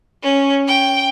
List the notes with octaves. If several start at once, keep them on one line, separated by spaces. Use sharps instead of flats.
C#4
G5